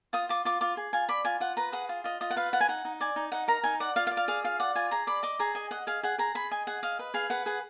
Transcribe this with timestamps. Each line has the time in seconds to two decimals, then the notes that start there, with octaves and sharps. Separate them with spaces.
0.13 F4 D#6
0.29 F4 D6
0.45 F4 D6
0.61 F4 D6
0.77 G#4
0.93 F4 G#5
1.09 D5 B5
1.25 F4 G#5
1.40 F4 F#5
1.57 B4 A#5
1.72 G#4 F#5
1.89 F4
2.04 F4 D#5
2.21 F4 D#5
2.30 F#5
2.36 B4 F5
2.53 F4 F#5
2.60 G#5
2.68 D#4 F#5
2.85 D#4
3.00 D5 G#5
3.16 D#4
3.32 D#4 F#5
3.48 A#4 A#5
3.63 D#4 G#5
3.80 D5 F#5
3.96 F4 F5
4.07 F5
4.11 D5
4.17 F5
4.28 G#4 F5
4.44 F4 F5
4.60 D5 F#5
4.75 F4 G#5
4.91 G#4 A#5
5.07 D5 B5
5.23 D#5 D6
5.39 G#4 A#5
5.55 D#5 G#5
5.71 D#5 F#5
5.87 G#4 F5
6.03 G#4 F#5
6.18 G#4 A#5
6.35 G#4 B5
6.51 D#5 G#5
6.67 G#4 F#5
6.83 D#5 F5
6.99 B4
7.14 G#4 F5
7.30 B4 F#5
7.46 G#4 F#5